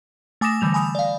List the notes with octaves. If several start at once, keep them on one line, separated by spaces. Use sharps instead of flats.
A3 G#5 D6 D#6 A#6 E7
D3 E3 G3 F7
G#5 B5 D#6
D5 F5